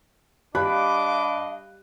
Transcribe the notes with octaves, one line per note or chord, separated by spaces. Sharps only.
G3 D4 D#5 F5 B5 D6 F#6